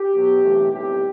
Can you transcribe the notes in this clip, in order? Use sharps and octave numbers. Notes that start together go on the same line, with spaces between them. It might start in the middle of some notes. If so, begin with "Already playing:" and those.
Already playing: G4
B1 B2 F#3 B3
B1 A2 E3 A3 C4
B1 A2 G3 C4 G4